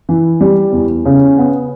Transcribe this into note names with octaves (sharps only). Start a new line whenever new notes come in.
E3
G3
E2
C#3
B3